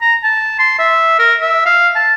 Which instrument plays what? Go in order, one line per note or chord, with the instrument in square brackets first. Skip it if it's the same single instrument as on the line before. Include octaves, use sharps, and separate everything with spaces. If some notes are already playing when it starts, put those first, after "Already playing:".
[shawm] A#5
A5
C6
E5
A#4
E5
F5
A5